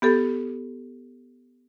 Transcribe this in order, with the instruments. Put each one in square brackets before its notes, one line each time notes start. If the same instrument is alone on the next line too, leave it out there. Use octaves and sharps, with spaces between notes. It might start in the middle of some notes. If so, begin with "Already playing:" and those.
[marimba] B3 G4 A4